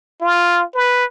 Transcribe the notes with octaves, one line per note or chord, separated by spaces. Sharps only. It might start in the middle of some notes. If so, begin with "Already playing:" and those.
F4
B4